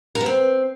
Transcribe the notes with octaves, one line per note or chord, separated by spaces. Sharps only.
A#4
B3
C4